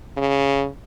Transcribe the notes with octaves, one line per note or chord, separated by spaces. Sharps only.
C#3